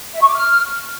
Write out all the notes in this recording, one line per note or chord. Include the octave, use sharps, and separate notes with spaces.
E5
C#6
D6
F6